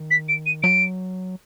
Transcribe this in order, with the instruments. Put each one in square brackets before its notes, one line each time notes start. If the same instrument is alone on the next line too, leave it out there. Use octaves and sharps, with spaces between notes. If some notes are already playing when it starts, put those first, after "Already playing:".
Already playing: [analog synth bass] D#3
[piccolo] B6
D7
D#7
[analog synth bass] F#3 [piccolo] D7